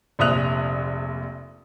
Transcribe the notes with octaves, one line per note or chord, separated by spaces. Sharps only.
F1 A#1 E5 D#6 F#6 F7